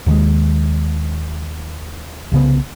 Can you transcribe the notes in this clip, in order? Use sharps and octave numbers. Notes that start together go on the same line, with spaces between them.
D#2 D#3 F#3 G#3
C2 C#3 B3